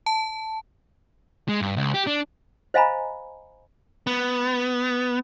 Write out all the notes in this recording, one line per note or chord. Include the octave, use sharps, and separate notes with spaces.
A5
G#3
G2
C#2
G4
D4
C5 D#5 F5 G#5 A#5 B5
B3